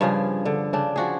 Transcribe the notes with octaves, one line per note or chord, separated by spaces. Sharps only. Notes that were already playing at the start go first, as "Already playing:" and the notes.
G2 C#3 F3 G#4
D3
C#3 D4
F3 F#4 G#4